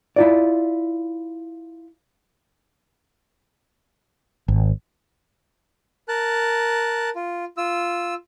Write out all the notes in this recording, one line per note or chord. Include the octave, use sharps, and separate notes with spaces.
E4 F4 D5
G#1
A#4 A5 F#6
F4
F4 E6